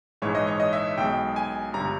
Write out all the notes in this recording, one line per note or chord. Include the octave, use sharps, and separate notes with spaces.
A#1 G#2 E3 G#3 C#5
D#5
C#5
D#5
E5
B1 B2 G#3 G5
G#5
G1 G2 G3 A#5